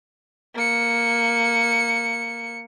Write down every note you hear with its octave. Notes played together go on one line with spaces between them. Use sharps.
A#3 C#7